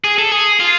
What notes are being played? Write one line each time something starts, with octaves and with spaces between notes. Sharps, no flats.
G#4
A4
G#4
F4